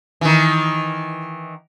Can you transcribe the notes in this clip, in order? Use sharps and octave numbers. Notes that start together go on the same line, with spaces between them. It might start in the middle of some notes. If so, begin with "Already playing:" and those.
D#3 E3